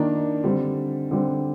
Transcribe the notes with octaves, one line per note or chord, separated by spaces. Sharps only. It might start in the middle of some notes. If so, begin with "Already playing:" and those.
Already playing: D#3 A#3 D4
D3 G3 C4
D3 G3 C4